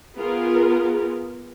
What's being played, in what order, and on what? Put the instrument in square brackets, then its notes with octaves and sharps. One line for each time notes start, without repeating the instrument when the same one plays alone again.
[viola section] B3 F4 G#4 A#4